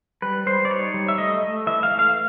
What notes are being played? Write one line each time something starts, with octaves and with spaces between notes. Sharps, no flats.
G3 B4
G3 C5
D5
D#4 C#5
G3
E5
A3 D#5
A3
E3 E5
F5
A3
F5